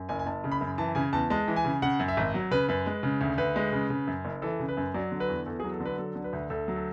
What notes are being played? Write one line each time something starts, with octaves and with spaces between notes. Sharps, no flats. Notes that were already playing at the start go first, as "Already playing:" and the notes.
Already playing: F#2
F#1 G#5
G#5
F#1 A5
C#3
B5
F#2
E3 A5
C#3 G#5
E2 A5
G#3 A5
E3
G#5
C#3
C#3 F#5
F#2
E5
G#1
F#3
C#3 B4
F#2 B4
G#3
C#3
D2
D2 B4
G#3
C#3
C#3
F#2
F#1
E3 A4
C#3
B4
F#2
F#3 D5
D3
B4
E2
E2 A4
G#4
F#3
A4
D3
B4
F#3 A4
D3
B4
D2
D2 A4
F#3
A4